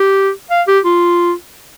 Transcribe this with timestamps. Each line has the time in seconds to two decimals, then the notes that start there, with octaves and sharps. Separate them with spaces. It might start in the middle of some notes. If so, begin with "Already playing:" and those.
Already playing: G4
0.50 F5
0.68 G4
0.85 F4